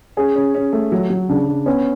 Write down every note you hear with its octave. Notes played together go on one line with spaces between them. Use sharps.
C#4 G#4
C#4
C#4
A3
F#3
F#3
C#3 D4
C#3
B3 C#4